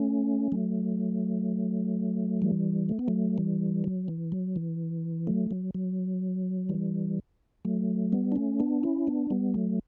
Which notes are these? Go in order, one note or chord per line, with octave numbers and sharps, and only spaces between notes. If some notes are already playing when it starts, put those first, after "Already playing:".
Already playing: A3 C#4
F#3 A3
E3 G3
A3
B3
F#3 A3
E3 G3
F#3
E3
F#3
E3
F#3 A3
F#3
F#3
E3 G3
F#3 A3
G3 B3
D4
A3 C#4
B3 D4
C#4 E4
B3 D4
G3 B3
F#3 A3